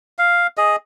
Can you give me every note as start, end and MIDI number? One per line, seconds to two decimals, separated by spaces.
0.19 0.47 77
0.58 0.76 68
0.58 0.76 75